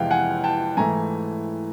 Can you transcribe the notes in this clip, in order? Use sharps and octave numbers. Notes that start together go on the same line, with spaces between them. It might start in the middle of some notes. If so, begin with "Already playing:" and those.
Already playing: F2 C3 E3 G#3 B3 F5 G5
F#5 G#5
G5 A5
G#2 E3 A3 G#5 A#5